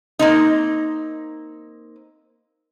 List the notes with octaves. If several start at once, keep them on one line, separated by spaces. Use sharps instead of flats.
A#3 C4 D#4